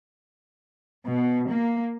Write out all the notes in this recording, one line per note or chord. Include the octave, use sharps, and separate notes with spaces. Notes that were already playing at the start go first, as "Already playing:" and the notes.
B2
A#3